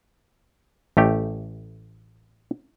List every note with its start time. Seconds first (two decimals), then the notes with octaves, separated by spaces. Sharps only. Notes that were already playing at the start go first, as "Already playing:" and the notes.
0.97 A1 A3 G4